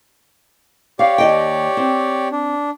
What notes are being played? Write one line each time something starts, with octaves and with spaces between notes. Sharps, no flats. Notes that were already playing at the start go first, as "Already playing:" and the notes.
G4 C#5 D5 F5
D#2 D#5 G5
C4
D4